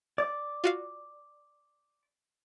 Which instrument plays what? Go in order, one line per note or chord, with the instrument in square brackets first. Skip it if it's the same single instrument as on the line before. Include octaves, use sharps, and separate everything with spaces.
[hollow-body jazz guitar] D5
[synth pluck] F4 F#4 F5